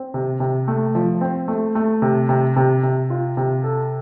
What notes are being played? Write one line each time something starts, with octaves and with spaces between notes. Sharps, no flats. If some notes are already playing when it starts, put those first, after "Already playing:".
Already playing: C4
C3
C3
A3
F3
C4
A3
A3
C3
C3
C3
C3
F4
C3
A4